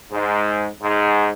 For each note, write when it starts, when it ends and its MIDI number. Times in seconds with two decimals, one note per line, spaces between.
0.12 0.65 44
0.82 1.30 44